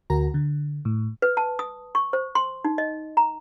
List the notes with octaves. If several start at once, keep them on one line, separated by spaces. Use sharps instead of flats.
D2 F#4 A#4 A#5
D3
A2
B4
A5
D#6
C#6
C5
C6
D#4
D#5
A#5